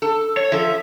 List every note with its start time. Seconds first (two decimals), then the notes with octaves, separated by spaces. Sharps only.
0.02 A4
0.37 C#5
0.52 F3 A4 E5